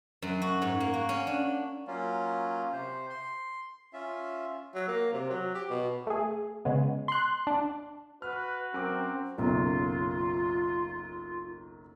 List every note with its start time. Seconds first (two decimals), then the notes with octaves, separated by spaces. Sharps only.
0.22 F#2
0.42 F#4
0.62 G#2
0.80 A#3
0.93 F#4
1.09 C#4
1.27 D4
1.87 F#3 A#3 C#4 F4
2.73 C3 C5
3.09 C6
3.93 C#4 F4 E5
4.75 F#3
4.88 A#3
5.13 C3
5.30 F#3
5.55 G4
5.70 B2
6.07 A3 G#4
6.65 C#3 G#3 B3
7.08 C6 F#6
7.47 D4
8.22 F#4 B4 F6
8.74 F#2 C4 A#4 D6
9.38 F#1 B1 F#2 F4